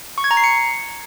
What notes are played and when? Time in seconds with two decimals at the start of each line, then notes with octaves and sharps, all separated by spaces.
0.18 C#6
0.24 G#6
0.31 A#5
0.37 C7
0.44 C#7